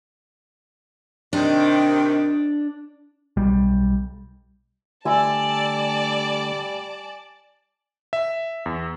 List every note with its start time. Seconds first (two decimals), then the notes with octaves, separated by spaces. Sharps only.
1.33 C3 D#3 D4
3.37 B1 G3
5.05 D3 G3 A3 D5 G#5 A5 E6
8.13 E5
8.66 E2